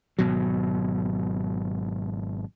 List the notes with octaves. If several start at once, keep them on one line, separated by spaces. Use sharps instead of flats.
G#1 B2 F#3